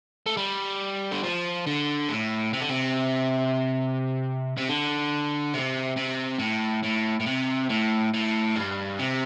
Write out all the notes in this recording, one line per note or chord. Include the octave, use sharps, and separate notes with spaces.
A3
G3
D3
F3
D3
A2
C3
D3
C3
C3
D3
C3
C3
A2
A2
A2
C3
A2
A2
G2
C3